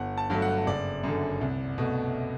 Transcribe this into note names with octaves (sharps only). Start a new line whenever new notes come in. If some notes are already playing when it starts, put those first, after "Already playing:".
Already playing: G1 F#5
A5
G2 F#3 A3
F#5
F#1 D5
F#2 D3
C2
B2 A3